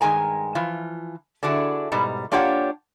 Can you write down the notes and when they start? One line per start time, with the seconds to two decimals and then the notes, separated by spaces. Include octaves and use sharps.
0.01 G2 D#3 G#3 G#5 A#5
0.55 E3 F3 F4
1.43 D3 D4 E4 F#4 G#4
1.92 G#2 B2 G3
2.32 A#3 D4 F4 G4 C#5 F#5